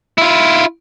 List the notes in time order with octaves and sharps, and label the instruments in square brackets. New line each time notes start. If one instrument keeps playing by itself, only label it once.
[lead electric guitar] E4 F4